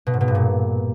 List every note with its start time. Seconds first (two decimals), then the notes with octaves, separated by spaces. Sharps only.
0.07 B2
0.14 G#2
0.21 B2
0.28 G2
0.35 A#2